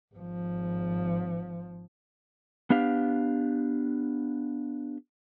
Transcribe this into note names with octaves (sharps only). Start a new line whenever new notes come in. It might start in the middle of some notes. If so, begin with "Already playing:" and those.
G#1 F3
B3 D4 G4 F5